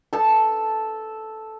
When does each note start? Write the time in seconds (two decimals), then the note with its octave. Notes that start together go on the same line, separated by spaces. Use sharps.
0.13 A4 A5